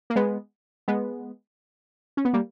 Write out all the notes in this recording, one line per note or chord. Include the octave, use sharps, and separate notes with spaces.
A#3
G#3 B3
G#3 B3
C#4
B3
G3 A#3